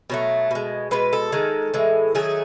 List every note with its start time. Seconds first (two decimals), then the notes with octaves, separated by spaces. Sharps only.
0.10 B2 F#3 A3
0.51 B2 G#3
0.91 B2 G#3 B4
1.13 A4
1.32 D#3 G#3
1.74 A2 E3 G#3
2.15 D#3 F#3 A3 G#4